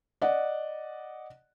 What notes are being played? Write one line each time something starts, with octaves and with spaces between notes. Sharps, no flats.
D5 D#5 F#5